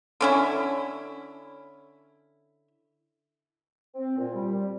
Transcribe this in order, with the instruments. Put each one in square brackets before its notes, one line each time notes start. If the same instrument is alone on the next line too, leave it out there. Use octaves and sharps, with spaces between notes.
[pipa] D3 C#4 E4
[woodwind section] C4
A#2
G3